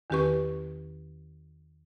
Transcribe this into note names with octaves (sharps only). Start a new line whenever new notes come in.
E2 D#3 C#4 G4 B4 C#6